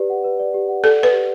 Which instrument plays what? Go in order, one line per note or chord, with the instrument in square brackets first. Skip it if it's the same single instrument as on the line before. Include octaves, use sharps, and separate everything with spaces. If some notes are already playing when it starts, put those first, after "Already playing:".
Already playing: [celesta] G4 B4 D5
F#5
B4
D5
G4
F#5
[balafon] A4 [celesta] D5
[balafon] B4 [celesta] F#5
[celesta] G4